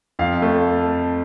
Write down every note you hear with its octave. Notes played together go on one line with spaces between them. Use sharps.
F2 F5
A3